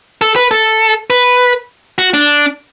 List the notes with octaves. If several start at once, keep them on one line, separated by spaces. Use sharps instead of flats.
A4
B4
A4
B4
F#4
D4